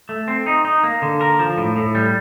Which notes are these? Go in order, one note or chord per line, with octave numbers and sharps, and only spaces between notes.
A3
C4
D#4
D#4
A#3
D3
A#4
F3
A2
A2
G3